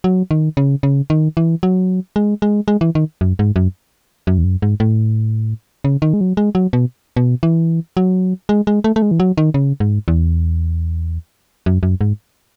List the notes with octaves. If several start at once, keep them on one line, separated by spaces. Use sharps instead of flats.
F#3
D#3
C#3
C#3
D#3
E3
F#3
G#3
G#3
G#3
E3
D#3
F#2
G#2
F#2
F#2
E2
F#2
G#2
A2
C#3
D#3
G#3
F#3
G#3
F#3
B2
B2
E3
F#3
G#3
G#3
A3
A3
G#3
E3
F#3
D#3
C#3
G#2
E2
F#2
F#2
G#2